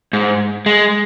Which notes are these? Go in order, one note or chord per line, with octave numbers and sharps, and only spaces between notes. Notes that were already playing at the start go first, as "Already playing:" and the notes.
G#2
G#3